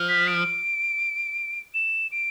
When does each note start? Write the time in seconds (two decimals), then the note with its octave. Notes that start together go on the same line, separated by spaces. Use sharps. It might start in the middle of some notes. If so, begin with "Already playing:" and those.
Already playing: F3
0.09 B6
0.27 D7
1.74 E7
2.12 D7